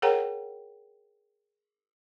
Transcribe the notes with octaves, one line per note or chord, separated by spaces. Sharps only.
G#4 A#4 C#5 F#5 G5 A#5